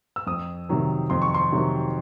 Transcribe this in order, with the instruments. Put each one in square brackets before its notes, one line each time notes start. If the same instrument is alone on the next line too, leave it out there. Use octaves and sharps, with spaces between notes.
[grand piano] E6
F2 D#6
C3 D#3 F#3
F2 C6
C#6
C6
C3 D#3 F#3